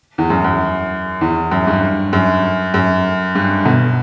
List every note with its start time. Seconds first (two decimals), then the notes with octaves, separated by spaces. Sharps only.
0.18 E2
0.30 F#2
0.44 F#2
1.21 E2
1.51 F#2
1.67 G2
2.13 F#2
2.74 F#2
3.35 G2
3.65 B2